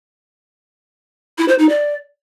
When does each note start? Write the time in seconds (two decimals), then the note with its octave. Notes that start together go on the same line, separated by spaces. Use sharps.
1.38 E4
1.48 C5
1.59 D#4
1.69 D5